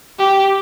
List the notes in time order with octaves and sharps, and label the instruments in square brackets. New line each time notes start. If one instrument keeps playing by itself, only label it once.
[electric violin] G4